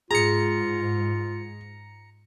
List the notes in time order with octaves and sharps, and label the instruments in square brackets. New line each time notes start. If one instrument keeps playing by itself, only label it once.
[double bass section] G#2 [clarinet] F4 [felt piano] G#4 [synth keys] A#5 C#7